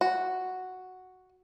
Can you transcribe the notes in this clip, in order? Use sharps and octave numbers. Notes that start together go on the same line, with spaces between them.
F#4